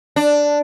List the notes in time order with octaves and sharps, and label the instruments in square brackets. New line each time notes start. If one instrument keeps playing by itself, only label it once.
[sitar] D4